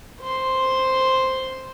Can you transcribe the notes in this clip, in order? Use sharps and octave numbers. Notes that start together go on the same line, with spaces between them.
C5 C6